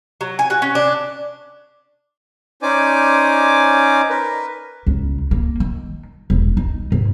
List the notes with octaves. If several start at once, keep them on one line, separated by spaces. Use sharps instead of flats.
F#3
G#5
F#4
C#4
D4
C#4 D#4 C5 D5 G#5 D6
A#4 B4
C#2
A#3
D#3
E1
D#4
G#2